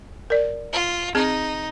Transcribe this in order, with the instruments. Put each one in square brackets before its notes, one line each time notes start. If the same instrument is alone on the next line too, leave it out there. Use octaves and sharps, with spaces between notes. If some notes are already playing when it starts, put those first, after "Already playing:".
[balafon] A#4 D5
[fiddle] F4
[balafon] C4 G#4 [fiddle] D#4